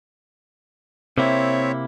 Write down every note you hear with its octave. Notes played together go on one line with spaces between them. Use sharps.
C3 A#3 C4 E4 C#5 E5